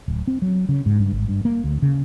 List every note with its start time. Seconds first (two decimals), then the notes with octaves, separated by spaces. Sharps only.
0.08 D1
0.28 C4
0.42 F#3
0.69 C#3
0.86 G#2
0.99 G2
1.13 G#1
1.28 G2
1.45 A#3
1.64 D2
1.82 C#3